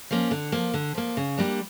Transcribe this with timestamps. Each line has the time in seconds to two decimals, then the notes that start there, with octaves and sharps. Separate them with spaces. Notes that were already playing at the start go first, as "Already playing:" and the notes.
0.11 F3 A#3 C#4
0.31 D3
0.52 F3 A#3
0.74 D3
0.95 F3 A#3
1.17 C#3
1.37 G3 A#3 D4